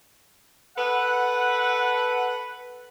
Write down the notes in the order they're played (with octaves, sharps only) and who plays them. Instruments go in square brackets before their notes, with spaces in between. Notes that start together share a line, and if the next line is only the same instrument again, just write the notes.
[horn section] A4 B4 F#5